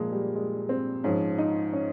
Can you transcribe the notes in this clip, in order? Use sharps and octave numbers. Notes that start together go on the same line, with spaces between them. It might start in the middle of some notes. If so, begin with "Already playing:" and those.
Already playing: A#2 F3 G#3 A#3
G3
G#3
C4
G#2 F3 C#4
D#4
C#4